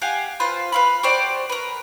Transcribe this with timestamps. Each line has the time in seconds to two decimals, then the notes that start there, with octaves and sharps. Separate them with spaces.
0.02 G4 F5 F#5 G#5
0.40 F4 B4 C5
0.72 B4 F5 B5
1.03 F#4 G4 C5 D5
1.50 A#4 B4